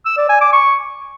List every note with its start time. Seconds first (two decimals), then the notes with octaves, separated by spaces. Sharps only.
0.05 E6
0.17 D5
0.29 G#5
0.41 D6
0.53 C#6